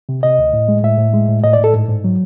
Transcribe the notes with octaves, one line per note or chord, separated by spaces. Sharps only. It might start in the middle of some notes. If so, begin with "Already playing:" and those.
C3
C3 D#5
D2
A2
G#3
A2 E5
A2
G#3
A2
A2 D#5
D5
A2
A4
G#2
G#2
F#3